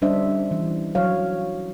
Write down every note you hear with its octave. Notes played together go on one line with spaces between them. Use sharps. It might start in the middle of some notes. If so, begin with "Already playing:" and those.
G3 C#4 D4 C5 D#5 E5
E3 D4
F#3 C#5 F5